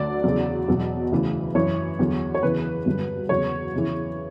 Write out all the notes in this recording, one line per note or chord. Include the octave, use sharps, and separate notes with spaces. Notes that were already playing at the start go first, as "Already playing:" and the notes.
Already playing: D2 D3 F#3 D5
E2 C#3 F#3
E2 B2 F#3
D2 C#3 E3
F#2 E3 C#5
E2 D3 F#3
C#5
E2 C#3 E3 B4
G2 D3 F#3
E2 C#3 F#3 C#5
E2 C#3 E3